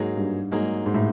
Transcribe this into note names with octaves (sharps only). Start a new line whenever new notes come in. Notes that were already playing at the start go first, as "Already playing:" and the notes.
Already playing: G#2 F#3 A#3 D#4 G#4
G2
G#2 F#3 A#3 D#4 G#4
G#2
A2